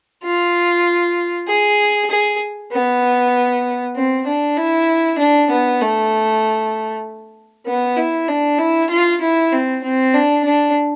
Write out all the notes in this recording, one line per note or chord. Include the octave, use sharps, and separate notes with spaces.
F4
G#4
G#4
B3
C4
D4
E4
D4
B3
A3
B3
E4
D4
E4
F4
E4
C4
C4
D4
D4